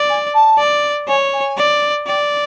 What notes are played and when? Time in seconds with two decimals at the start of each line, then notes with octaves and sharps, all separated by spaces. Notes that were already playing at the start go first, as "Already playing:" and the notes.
Already playing: D5
0.09 G#5
0.34 A5
0.58 D5
1.07 C#5 G#5
1.33 G#5
1.58 D5
2.07 D5 G5